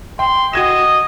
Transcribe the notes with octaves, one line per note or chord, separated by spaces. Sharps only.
G5 C6
F#4 D#5 G#6 E7